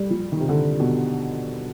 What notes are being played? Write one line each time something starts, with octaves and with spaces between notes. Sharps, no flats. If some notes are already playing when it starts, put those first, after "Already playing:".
Already playing: G3
F3
D#3
C3
D3
B2